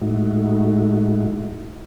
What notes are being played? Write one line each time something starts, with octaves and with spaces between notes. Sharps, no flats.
A2 G#3 A3 D#4 E4 F#4